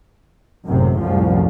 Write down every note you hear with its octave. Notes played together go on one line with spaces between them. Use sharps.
G#1 F#2 A2 C3
C2 F#2 A2 F3